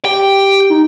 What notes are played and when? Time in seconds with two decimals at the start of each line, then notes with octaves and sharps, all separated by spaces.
0.05 G4 G5
0.70 D#4